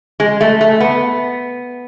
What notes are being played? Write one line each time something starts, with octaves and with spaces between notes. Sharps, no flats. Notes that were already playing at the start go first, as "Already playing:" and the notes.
G#3
A3
A3
B3